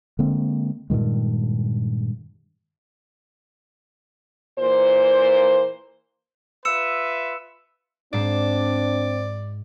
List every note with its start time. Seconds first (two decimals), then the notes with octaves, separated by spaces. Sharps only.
0.19 D3 G#3 A#3 C4
0.90 G2 A#2 D#3 G#3
4.59 A#2 E3 A#3 C5
6.65 F4 B4 E5 E6 C#7 E7
8.13 G#2 C4 D4 D5 C7 E7